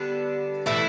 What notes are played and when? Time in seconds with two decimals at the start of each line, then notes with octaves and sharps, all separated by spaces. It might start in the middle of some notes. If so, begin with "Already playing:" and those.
Already playing: D3 G3 B3 D4
0.66 A2 E3 A3 E4